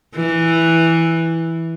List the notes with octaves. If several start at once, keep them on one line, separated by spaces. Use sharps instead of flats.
E3